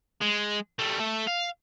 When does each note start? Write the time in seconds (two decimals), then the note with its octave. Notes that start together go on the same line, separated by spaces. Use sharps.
0.21 G#3
0.79 G3 A3
1.00 A3
1.27 F5